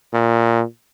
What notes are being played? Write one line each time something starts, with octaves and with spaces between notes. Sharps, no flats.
A#2